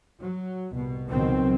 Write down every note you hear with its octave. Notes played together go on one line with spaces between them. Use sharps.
F#3
C2 B2
C#2 B2 D#3 F#3 C4